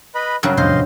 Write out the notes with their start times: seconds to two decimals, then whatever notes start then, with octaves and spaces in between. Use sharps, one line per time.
0.15 B4 D#5 B5
0.43 G2 C#3 F#3 A#4
0.57 F1 E2 A2 C5 D#5 F5 C6